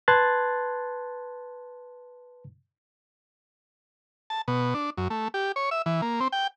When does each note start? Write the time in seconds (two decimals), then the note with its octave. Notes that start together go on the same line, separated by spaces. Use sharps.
0.08 B4 A5 C6 F#6 G#6 A6
4.30 A5
4.48 B2
4.74 D4
4.97 F#2
5.10 A3
5.34 G4
5.56 C#5
5.71 E5
5.86 E3
6.02 A#3
6.20 C4
6.32 G5